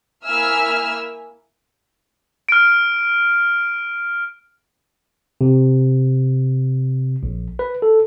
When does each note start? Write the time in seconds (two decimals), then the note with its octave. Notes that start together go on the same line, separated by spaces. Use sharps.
0.25 A#3 E4 E5 G#5 E6 F6
2.49 F6 D7
5.41 C3
7.23 A#1
7.59 B4
7.82 A4